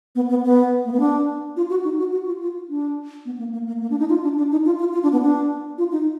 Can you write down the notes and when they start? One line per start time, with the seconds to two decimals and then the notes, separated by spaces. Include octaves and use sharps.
0.15 B3
0.30 B3
0.45 B3
0.85 A#3
0.92 B3
1.00 D4
1.57 F4
1.70 F#4
1.84 D#4
1.99 F#4
2.12 F#4
2.26 F4
2.41 F4
2.69 D4
3.26 B3
3.39 A#3
3.53 A#3
3.67 A#3
3.81 A#3
3.90 D4
3.99 D#4
4.09 F4
4.23 D4
4.38 D4
4.51 D#4
4.66 F4
4.79 F4
4.93 F4
5.03 D4
5.12 B3
5.22 D4
5.78 F4
5.92 D#4